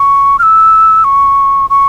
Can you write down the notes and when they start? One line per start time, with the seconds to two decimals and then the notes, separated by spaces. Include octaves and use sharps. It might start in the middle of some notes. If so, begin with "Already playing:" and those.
Already playing: C#6
0.39 F6
0.43 E6
1.04 C#6
1.70 C#6